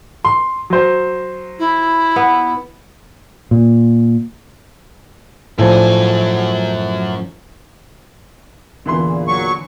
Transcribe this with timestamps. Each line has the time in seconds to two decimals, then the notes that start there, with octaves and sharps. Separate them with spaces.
0.25 C6
0.70 F#3 C5
1.59 E4
2.16 B3
3.51 A#2
5.59 F#2 A2 F3 D4 G#5
8.86 E2 A#2 D3 E3 C6
9.27 F#3 C#6